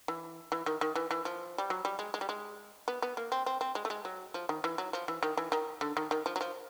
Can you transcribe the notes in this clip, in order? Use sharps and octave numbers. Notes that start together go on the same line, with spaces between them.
E3
E3
D#3
D#3
E3
E3
F3
G3
F#3
G3
G#3
G#3
G3
G#3
B3
B3
A#3
C4
C4
C4
G#3
A3
G#3
F#3
F3
D#3
E3
F#3
F3
E3
D#3
E3
D#3
D3
D#3
D#3
F3
F#3
F3